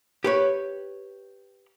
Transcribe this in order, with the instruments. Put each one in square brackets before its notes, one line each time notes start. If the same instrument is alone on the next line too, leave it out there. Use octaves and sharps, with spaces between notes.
[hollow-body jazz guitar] G4 B4 C#5